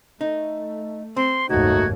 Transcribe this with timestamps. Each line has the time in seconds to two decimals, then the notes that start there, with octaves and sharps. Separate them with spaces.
0.21 A3 D#4
1.17 C4 C6
1.50 F#1 D#2 G#2 A3 D#4 F#4 G#6